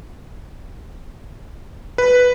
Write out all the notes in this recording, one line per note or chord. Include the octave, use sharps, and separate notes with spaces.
B4